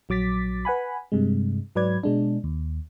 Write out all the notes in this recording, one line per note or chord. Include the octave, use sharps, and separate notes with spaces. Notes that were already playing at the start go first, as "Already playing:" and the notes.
A#1 F#3 D6 A6 B6
B4 F#5 G#5 B5
G2 C3 G#3
G#2 F#3 B4 D5 G#6
B2 G#3 D4
D#2